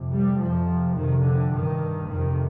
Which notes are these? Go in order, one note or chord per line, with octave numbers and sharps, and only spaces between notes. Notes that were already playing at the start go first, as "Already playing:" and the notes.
Already playing: F2 C3
G3
F2 C3 F3
F2 C3 D#3
D3
G2 D#3
F2 C3 D#3